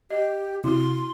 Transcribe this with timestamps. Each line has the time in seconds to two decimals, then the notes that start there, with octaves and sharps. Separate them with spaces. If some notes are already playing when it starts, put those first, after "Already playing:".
0.11 G4 D#5
0.64 C3 E4 F#4 C6